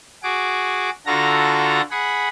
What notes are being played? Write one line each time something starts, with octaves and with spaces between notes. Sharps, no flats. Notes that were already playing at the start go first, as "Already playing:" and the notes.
F#4 G#4 D6
D3 F4 F#4 A4 A#5 A#6
G#4 F#5 B5